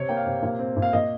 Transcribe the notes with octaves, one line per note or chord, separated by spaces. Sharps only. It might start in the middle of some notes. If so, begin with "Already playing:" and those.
Already playing: C3 C#5
A#3 G5
F5
C3
A#2
C4
A#2
F5
A#2 D#5